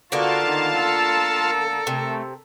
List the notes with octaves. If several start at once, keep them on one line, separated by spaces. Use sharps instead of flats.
D3 A#3 B3 F4 F#4 F5 A5
D#3
A4 A#4
C3 A3